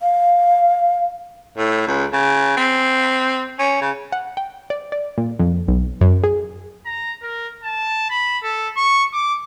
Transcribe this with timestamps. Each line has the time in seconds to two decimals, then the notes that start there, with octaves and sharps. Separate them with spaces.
0.01 F5
1.57 A2
1.87 C#2
2.13 C#3
2.57 C4
3.59 C#4
3.82 C#3
4.12 F#5
4.37 G5
4.70 D5
4.92 D5
5.18 A#2
5.39 F2
5.68 B1
6.01 F#2
6.24 G#4
6.86 A#5
7.22 A#4
7.64 A5
8.10 B5
8.43 A4
8.77 C#6
9.14 D6